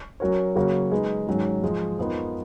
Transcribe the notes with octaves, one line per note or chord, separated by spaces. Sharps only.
F#3 C#4 F#4 A#4 C#5
C#3 F#3 A#3 C#4 F#4
G#3 D#4 G#4 B4
G#2 D#3 F#3 C#4 G#4
G#2 F3 G#3
F2 F3 B3 D#4 A#4